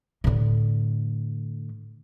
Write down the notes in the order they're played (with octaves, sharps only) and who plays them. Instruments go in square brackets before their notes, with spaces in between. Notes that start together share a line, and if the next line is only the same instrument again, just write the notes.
[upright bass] A2 D3